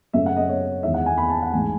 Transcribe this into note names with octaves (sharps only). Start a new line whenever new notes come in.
F#2 C#3 F#3 A3 C#4 E5
F#5
D#5
C#5
E2 D#3 G#3 E5
F#5
G#5
B5
A5
F#5
A1 G#2 E3 G#3 D#4 G#5